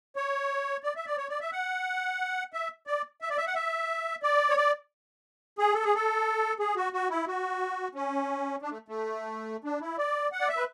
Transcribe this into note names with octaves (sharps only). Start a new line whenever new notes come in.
C#5
D5
E5
D5
C#5
D5
E5
F#5
E5
D5
E5
D5
E5
F#5
E5
D5
C#5
D5
G#4
A4
G#4
A4
G#4
F#4
F#4
E4
F#4
C#4
D4
A3
A3
D4
E4
D5
F#5
D5
E5
B4